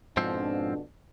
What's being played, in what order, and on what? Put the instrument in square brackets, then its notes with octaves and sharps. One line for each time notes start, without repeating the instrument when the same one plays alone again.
[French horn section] F2 B2 D4 [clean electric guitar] G#2 F3 C4